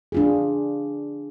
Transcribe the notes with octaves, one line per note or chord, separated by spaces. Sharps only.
D4 F4 G#4